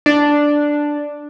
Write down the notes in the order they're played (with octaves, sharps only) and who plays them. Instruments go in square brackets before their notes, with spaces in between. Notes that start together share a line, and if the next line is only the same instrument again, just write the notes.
[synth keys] D4